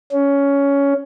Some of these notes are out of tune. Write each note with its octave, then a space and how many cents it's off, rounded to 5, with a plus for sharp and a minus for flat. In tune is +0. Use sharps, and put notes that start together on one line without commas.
C#4 +15